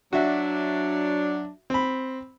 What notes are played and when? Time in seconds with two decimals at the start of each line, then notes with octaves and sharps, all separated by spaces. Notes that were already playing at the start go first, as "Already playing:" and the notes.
0.13 F#3 D4 F#4 E5
1.70 C4 B5